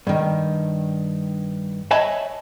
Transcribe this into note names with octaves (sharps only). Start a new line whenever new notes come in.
G2 D#3
C#5 D#5 E5 G#5 A5 B5